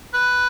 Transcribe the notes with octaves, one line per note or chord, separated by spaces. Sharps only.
B4